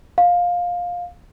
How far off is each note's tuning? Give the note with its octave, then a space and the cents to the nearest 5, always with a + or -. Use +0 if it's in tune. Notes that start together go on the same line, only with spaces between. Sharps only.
F5 +15